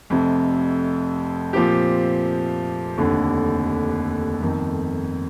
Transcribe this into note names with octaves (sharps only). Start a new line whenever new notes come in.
F1 F2 C3
A#2 F3 C4 G4
F1 D#2 D3
G1 F2 D#3